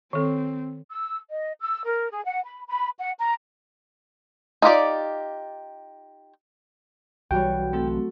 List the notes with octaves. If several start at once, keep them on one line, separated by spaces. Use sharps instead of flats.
D#3 C4 A4
E6
D#5
E6
A#4
G#4
F#5
B5
B5
F#5
A#5
D#4 F4 G4 D5
B1 E3 G3 F#4 G4 C#5 G5
F#3 A3 C4 A4